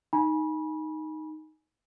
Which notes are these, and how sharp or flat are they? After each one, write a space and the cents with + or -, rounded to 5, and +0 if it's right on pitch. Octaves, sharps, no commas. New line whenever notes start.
D#4 +0 G#5 +10 B5 -30